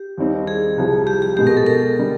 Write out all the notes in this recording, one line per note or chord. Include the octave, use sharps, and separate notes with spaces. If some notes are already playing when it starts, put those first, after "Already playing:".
Already playing: G4
D#2 D#3 G3 C4 D#4
G#4
C2 C3 F3
G4
G4
B2 G#3 B3 G4
A#4
A4
A#4
D3 G3